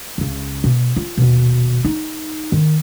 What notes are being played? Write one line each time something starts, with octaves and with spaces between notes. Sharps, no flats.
C#2 C#3
B2
F4
D#1 B2
D#4
D#3